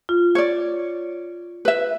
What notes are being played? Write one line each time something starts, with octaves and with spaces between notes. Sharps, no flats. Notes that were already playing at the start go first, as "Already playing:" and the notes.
F4
C#5 D5
B4 E5